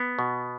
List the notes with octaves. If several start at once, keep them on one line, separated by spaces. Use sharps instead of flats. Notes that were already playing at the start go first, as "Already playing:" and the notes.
Already playing: B3
B2